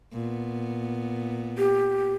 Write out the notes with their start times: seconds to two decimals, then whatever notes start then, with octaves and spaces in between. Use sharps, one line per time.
0.13 A#2 B3
1.58 G4